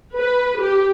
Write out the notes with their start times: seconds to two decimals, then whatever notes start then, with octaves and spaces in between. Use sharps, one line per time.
0.16 B4
0.60 G4